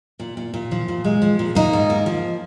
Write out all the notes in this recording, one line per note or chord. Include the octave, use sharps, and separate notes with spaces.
A#2
A#2
A#2
F3
A#2
G#3
F3
A#2
A#3 D#4
G#2
A#3
F3